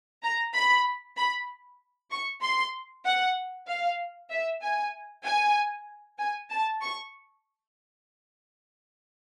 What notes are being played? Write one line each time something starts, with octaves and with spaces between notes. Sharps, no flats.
A#5
B5
B5
C#6
C6
F#5
F5
E5
G#5
G#5
G#5
A5
C#6